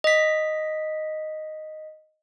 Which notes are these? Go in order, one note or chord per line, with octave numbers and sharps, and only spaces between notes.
D#5 B6